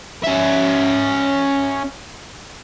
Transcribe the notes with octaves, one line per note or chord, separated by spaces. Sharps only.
C#4 E5